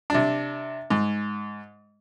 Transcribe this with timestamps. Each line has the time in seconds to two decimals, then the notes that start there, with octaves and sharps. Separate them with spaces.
0.10 C3 D4
0.90 G#2